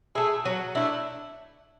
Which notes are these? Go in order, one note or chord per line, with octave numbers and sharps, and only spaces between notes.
A3 E4 G#4
F#3 F#4
A3 D4 E4